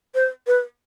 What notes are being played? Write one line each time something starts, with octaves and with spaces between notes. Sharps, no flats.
C5
B4